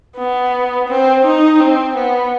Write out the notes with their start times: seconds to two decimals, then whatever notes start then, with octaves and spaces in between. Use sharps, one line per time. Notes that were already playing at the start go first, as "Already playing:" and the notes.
0.17 B3
0.88 C4
1.25 D#4
1.60 C4
1.96 B3